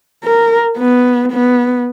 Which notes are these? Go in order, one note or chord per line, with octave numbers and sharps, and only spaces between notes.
A#4
B3
B3